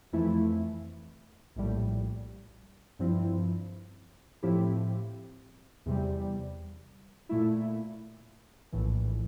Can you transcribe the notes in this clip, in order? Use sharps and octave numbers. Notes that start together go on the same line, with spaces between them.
F2 E3 A3 E4
A#1 A2 G3
G2 F3 C4 E4
A2 F3 C4 E4 G4
E2 C3 G3
A#2 A3 E4
A#1 A2 E3